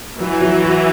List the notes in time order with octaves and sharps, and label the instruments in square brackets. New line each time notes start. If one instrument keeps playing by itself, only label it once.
[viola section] E3 [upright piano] F#3
[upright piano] F#3
F#4